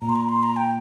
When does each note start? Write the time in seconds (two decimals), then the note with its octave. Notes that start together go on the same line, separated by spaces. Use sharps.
0.02 A#2 A#5
0.09 C6
0.15 A#5
0.29 C6
0.43 A#5
0.56 G5